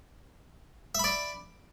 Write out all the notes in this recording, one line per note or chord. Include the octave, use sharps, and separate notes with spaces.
D5 E5 B5